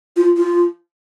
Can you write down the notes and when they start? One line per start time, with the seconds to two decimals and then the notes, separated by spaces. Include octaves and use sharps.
0.16 F4
0.37 F4